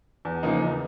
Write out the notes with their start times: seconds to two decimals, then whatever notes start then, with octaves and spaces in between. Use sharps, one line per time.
0.25 E2
0.43 C#3 F3 A#3 D#4
0.62 E2